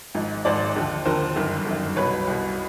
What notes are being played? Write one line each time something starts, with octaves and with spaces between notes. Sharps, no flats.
G#1 G#2 F3
G#1 G#2 F3 C5 D5
D#2 D3 F3
D#2 D3 F3 A#4 C5
G1 F#2 D#3
G1 F#2 D#3
C2 B2 B4 C#5
C2 B2